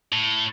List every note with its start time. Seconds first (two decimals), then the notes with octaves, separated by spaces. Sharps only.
0.12 A2